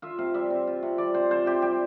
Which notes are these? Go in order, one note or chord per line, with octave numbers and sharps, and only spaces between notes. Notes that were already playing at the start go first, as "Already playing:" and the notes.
F4 E5
C3 F5
G3 E5
C4
F4
C3
G3 D5
C4 C5
F4 C5
C3 G4
G3 G4